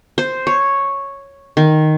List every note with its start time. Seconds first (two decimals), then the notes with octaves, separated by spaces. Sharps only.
0.18 C5
0.47 C#5
1.57 D#3